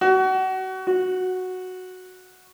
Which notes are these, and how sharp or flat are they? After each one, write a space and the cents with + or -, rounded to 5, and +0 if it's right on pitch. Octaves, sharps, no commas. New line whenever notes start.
F#4 +30
F#4 -5